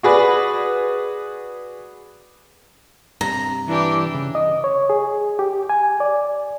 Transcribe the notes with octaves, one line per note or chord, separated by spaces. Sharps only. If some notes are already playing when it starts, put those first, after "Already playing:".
F#4 G#4 B4 D5
G2 C3 A#5
E3 D4 G4
C#3
D#5
C#5
G#4
G4
G#5
D5